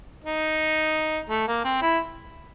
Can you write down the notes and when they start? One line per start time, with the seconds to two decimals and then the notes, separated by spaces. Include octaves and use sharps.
0.24 D#4
1.29 A3
1.47 A#3
1.64 C4
1.82 E4